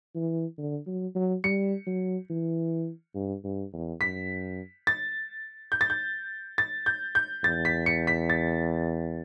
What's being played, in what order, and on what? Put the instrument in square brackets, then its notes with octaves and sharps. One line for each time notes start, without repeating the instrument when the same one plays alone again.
[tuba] E3
D3
F#3
F#3
[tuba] G3 [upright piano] C#7
[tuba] F#3
E3
G2
G2
E2
[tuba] F#2 [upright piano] B6
[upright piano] A6
G6
A6
G6
A6
G6
G6
[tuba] E2 [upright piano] A6
[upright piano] B6
C#7
B6
A6